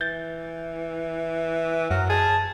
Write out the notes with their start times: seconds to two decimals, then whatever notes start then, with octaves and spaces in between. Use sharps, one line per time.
0.01 E3 G6 A6
1.91 F#2 F#3 A#4
2.10 G#4 A5